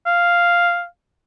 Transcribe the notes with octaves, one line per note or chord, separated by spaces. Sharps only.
F5